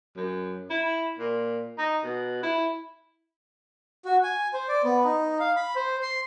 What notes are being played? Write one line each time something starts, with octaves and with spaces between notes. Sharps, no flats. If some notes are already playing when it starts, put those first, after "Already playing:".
F#2
E4
A#2
D#4
B2
E4
F#4
G#5
C5
D5
B3
D#4
F5
B5
C5
C6